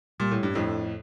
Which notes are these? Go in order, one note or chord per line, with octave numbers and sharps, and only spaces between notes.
A#2 G3
A2
G2
F2 A2 D4